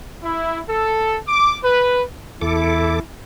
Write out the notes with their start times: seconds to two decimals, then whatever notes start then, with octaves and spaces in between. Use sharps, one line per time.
0.24 E4
0.68 A4
1.27 D6
1.64 B4
2.42 E2 E4 A4 D6